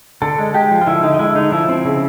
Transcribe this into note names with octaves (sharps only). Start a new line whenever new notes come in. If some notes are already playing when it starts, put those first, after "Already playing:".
D3 A4
G#3
G#3 G4
F3
F4
D3 E4
D3 D#4
D#4
G#3 E4
D3 D#4
F3 E4
C4
C#3